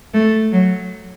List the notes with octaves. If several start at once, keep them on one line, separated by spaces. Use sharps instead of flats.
A3
F#3